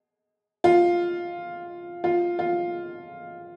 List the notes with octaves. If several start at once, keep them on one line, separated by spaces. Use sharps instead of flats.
F4
F4
F4